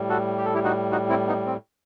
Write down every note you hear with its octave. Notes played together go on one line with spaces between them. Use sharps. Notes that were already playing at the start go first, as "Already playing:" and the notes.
Already playing: A2 G3
F#4 A4
G4
A4
E4 G4
D#4 F#4
D#4 F#4
C4 E4
B3 D#4
C4